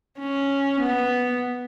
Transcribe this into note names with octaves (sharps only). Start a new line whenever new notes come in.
C#4
B3